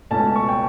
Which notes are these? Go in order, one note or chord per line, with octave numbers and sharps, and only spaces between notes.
C#2 B2 A3 C#4 A5
C#6
G5